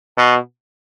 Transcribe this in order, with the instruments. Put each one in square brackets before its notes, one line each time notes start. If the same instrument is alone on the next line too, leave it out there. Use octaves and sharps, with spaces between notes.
[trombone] B2